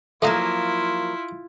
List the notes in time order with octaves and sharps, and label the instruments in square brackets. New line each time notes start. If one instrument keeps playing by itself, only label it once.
[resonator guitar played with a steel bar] F3 F#3 A#3 [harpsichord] A3 D#5 F5 [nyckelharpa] E4 F4